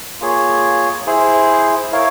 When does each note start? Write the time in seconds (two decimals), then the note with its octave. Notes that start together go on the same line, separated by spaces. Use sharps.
0.20 A#3 F4 G#4 C#5
1.06 E4 G#4 C5
1.92 E4 A#4 C#5 F5